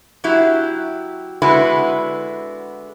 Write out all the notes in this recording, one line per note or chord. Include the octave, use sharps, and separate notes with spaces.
F#3 E4 G4
D3 G#3 B3 E4 F#4 B4